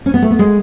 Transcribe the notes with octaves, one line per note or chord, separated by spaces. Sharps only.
C#4
B3
A3
B3
G#3